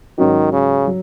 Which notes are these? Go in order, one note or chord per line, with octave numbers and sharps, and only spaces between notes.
G#2 D#3 F#3 C#4 F#4
C#3
F#3